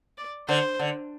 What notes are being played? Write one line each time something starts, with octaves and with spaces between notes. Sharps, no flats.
D5
D3 C5
D3